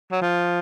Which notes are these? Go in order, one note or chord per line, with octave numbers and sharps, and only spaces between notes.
F#3
F3